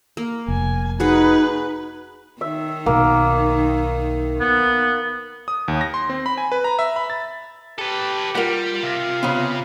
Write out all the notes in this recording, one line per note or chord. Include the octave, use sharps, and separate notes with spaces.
A#3
F1 G#5
D#4 F#4 G#4 B4 F#5
D#3 D#4 E5
B1 A#3
B3
D#6
D#2
A#6
C6
C4
B5
G#5
B4
A#5
E5
B5
A6
G4 A4 B4
G3 F4 A#4 F#5
C3 F5
C#3 B3 C4